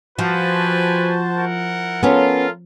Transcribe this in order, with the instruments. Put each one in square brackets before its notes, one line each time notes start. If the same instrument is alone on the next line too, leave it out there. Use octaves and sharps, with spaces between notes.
[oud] F3 [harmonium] F#4 C5 A5 [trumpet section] G4 B4 G#5
[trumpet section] E4 A#4 F#5
[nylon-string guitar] B3 C#4 [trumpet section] F4 [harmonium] A4 A#4 F5